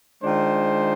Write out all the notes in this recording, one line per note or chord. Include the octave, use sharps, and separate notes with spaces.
D#3 G#3 D4 F4 C5